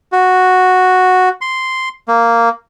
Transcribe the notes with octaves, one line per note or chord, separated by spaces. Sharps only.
F#4
C6
A#3